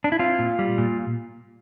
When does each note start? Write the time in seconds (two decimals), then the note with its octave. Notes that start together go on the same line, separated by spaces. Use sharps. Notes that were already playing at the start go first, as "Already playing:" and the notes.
0.04 D4
0.12 E4
0.19 C4 F4
0.39 A#2
0.59 G3
0.78 A#2